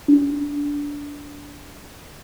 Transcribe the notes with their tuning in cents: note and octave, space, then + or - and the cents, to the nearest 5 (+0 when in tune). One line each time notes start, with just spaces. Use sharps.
D4 -20